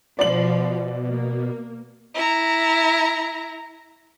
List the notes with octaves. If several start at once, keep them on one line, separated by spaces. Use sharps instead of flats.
B2 F3 D5 F#7
A#3
E4 A#5